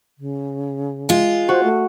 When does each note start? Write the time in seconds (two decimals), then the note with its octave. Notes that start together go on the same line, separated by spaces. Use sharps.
0.18 C#3
1.09 G#3 F4
1.49 F#4 C5
1.64 A3